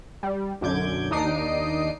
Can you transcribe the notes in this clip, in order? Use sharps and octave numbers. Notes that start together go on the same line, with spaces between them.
G3
B1 F#2 D3 D6 G6 G#6
D#2 D4 D#4 D#6 C7 D7